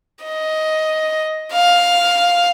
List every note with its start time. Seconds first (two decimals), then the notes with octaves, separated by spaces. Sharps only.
0.25 D#5
1.52 F5